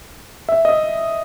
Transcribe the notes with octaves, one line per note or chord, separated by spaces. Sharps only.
E5
D#5